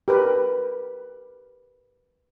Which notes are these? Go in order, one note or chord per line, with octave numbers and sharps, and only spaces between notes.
G4 A#4 B4